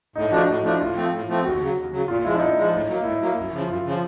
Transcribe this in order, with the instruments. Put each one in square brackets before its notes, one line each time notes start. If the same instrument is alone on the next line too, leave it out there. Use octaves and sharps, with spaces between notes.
[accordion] A2 [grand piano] D#4
[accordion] F3 A3 D4 [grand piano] F#4
[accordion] A2
[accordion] F3 A3 D4 [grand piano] E4
[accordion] A2 [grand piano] F4
[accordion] F3 A3 C4
A2
F3 A3 C4
[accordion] D#2 [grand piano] F#4
[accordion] C#3 F#3
D#2
C#3 F#3
[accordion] A#2 [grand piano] F4
[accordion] F3 G#3 [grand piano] E4
[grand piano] D4
[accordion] A#2 [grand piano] D#4
[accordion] F3 G#3
A2
F#3 A#3
[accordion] A2 [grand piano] E4
[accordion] F#3 A#3
F#2
C#3 F3
[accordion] F#2 [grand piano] F4
[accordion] C#3 F3